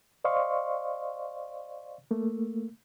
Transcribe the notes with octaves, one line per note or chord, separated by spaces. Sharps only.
C5 D5 D#5 F5 C6 C#6
A3 A#3